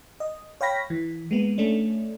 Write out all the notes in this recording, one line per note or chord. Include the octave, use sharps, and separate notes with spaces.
D#5
C#5 F5 G5 B5 A#6 B6
E3
G#3 A#3 B3
A3 C#4 D4